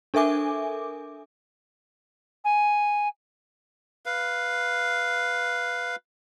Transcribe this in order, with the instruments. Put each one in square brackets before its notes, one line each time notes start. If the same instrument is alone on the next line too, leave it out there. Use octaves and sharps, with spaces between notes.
[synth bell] D4 A4 A#4 E5 G#5 D6
[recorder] G#5
[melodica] B4 F5